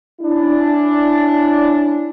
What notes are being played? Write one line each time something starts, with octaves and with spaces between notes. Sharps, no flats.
C#4 D4 E4